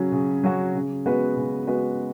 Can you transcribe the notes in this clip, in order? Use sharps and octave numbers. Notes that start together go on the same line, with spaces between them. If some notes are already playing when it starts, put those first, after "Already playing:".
Already playing: C#3 F#3 C#4 F#4
C#3
F#3 C#4 F#4
C#3
G#3 B3 F#4 B4
C#3
G#3 B3 F#4 B4